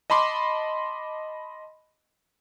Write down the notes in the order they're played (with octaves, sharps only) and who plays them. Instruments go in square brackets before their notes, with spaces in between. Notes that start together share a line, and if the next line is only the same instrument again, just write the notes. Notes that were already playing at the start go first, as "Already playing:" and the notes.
[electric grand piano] D#5 A5 B5 C6 D6